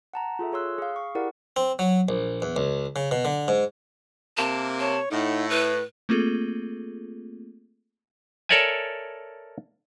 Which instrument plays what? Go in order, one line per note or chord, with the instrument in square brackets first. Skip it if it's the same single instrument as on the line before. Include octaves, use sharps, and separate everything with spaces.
[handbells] F#5 A5 A#5
F4 G#4 A4 E5
G#4 C#5 C6 E6 F#6
G#4 F5
C#6
E4 G4 G#4 A#4 D5 F#5
[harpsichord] C4
F#3
A#1
E2
C#2
C#3
B2
D3
G#2
[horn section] C3 A#3 [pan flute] A5
[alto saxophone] C#5 [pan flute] A5
[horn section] A2 [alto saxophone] D#4 [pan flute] F#5
[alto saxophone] E4 [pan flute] B4
[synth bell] A3 A#3 C4 F4 G#4 A4
[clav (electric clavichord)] A4 A#4 C#5 D5 E5 G#5